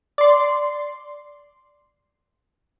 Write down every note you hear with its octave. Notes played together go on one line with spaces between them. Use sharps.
D5 C6